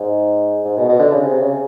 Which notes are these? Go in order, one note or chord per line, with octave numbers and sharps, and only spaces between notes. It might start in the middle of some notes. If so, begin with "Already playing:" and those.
Already playing: G#2
G#2
B2
B2
D3
C#3
C3
C#3